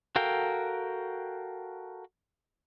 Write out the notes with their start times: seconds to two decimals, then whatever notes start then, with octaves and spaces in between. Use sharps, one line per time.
0.16 F#4 A4 A#4 F5 G5